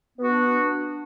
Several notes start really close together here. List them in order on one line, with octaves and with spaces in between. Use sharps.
B3 F#4 D4